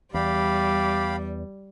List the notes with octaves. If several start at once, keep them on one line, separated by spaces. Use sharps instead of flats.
E2 G3 G4 D5 F5 B5